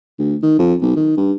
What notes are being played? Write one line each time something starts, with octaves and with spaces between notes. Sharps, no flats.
D2
D#3
F2
B1
D#3
G2